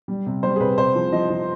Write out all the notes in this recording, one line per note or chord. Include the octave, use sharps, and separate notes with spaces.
G3
C3
G3 C5
G#4
C3 B4
C3 C5
F3
F3 D#5
F3